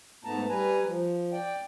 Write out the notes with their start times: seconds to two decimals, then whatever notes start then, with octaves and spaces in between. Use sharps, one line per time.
0.24 G#2 A3 B3 A5 A#5
0.49 G3 B4 G#5 A#5
0.85 F3
1.33 D5 G5